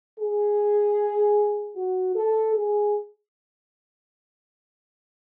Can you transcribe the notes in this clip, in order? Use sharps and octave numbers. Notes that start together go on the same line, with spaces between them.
G#4
F#4
A4
G#4